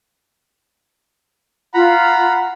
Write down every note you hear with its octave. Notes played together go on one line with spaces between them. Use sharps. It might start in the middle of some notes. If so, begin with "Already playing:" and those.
F4 F#5 A#5 B5